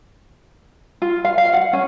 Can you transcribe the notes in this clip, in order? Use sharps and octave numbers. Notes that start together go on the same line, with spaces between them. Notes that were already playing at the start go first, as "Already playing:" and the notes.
F4
F5
F5
F#5
C#4